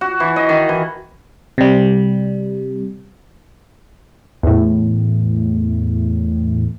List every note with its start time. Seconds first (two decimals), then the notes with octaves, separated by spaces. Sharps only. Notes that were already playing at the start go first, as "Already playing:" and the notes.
0.01 F#4
0.20 E3
0.36 D#5
0.49 D#3
0.69 E3
1.58 C3 G3
4.43 E2 A2